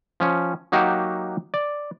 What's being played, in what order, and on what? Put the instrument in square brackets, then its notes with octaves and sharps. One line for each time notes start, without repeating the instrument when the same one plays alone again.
[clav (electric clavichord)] F3 C#4
F#3 A#3 D#4 F#4 G4
D5